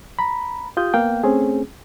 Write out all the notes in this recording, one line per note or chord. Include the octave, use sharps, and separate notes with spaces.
A#5 B5
F4 G4 D#6 G6
A#3 B3 F5 G5
A3 C4 C#4 G#4